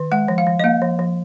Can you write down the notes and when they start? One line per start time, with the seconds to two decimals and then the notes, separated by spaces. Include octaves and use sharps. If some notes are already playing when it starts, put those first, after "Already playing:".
Already playing: D#3
0.12 G#3 F#5
0.28 F3
0.38 F5
0.46 F3
0.60 D#5
0.64 A#3 F5
0.82 F3
0.99 F3